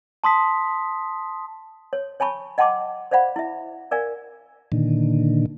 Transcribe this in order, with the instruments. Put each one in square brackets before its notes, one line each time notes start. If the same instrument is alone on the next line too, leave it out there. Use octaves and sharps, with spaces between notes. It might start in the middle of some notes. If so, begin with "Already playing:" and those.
[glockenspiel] A5 C6 D#6 B6
[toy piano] C#5
C#5 G#5 A5 B5 C#6
D#5 F#5 G5 A5 C6 D6
C5 D5 F5 F#5 B5
E4 E5
A#4 D5 F5 G#5
[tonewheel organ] A#2 D3 D#3